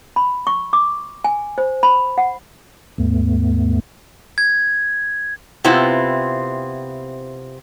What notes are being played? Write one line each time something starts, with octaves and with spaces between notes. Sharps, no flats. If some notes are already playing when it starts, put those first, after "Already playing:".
B5
C#6
D6
G#5
C5
B5
F#5
D#2 G#2 A3 B3
G#6
C3 B3 C4 E4 F4